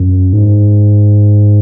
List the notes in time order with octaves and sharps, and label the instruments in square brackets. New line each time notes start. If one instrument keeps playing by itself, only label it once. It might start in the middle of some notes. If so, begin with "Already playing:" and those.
Already playing: [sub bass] F#2
G#2